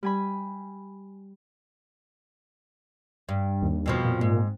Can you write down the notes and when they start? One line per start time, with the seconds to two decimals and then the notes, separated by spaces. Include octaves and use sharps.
0.03 G3 G#5 B5
3.29 G2
3.62 D#2
3.86 F2 B2 F3
4.05 A#2
4.21 G#2